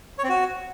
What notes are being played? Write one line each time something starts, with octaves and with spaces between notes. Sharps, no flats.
C#5
C4
F#4